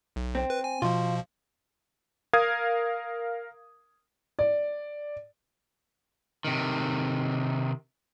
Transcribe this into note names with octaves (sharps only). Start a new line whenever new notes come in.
B1
C4
B4
G#5
B2 F3 F4
A#4 F5 D#6 G#6
D5
C3 D#3